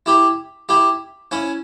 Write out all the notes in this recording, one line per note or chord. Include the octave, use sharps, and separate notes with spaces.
E4 G4
E4 G4
C#4 E4